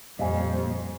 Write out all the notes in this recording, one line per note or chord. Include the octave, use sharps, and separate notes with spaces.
F2 A#2 G3 C4 D#5 F5 G#5